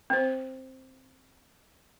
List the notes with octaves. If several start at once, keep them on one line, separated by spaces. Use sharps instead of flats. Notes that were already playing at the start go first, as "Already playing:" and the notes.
C4 C5